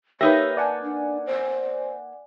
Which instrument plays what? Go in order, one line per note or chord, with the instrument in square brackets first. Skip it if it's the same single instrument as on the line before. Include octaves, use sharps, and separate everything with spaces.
[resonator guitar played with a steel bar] A#3 D#4 B4 [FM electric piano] G4 E5 A#6 [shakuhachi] C#5
[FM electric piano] D5 F#5 G#5 [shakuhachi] A5
[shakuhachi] D4
C5